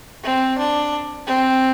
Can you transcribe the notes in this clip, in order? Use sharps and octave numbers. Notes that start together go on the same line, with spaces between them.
C4
D4
C4